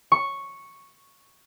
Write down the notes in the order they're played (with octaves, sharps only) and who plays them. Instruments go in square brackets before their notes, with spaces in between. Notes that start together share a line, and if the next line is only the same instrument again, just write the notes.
[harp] C#6